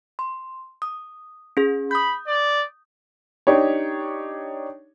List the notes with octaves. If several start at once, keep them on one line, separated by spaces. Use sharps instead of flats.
C6
D#6
C#4 G#4
B5 D#6 G6
D5
D4 D#4 G4 C#5